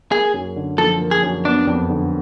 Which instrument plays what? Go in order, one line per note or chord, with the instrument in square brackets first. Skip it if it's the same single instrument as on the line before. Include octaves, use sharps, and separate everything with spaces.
[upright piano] A#3 [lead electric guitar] G#4
[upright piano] F#2
D3
[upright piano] F3 [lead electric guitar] A4
[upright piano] A#3
[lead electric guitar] G#4
[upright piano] F#2
[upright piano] B3 [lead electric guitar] D4
[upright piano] F2
D3